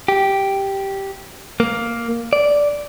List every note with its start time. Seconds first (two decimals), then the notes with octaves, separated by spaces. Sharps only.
0.08 G4
1.60 A#3
2.33 D5